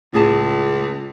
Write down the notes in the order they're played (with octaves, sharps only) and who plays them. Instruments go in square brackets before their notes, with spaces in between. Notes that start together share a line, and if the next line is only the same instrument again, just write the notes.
[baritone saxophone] C#2 [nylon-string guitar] A2 G#4 A5